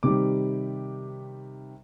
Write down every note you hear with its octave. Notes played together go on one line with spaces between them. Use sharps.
C3 D#3 G3 D6